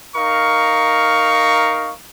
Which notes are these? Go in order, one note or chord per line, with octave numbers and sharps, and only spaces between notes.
D#4 A#4 F5 C#6